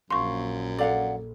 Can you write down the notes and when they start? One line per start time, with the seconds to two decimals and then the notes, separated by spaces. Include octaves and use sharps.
0.10 A#1 F#2 F5 C6 C#6
0.79 A4 D5 F5 F#5